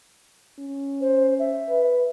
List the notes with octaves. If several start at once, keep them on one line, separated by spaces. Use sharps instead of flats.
C#4
C5
E5
B4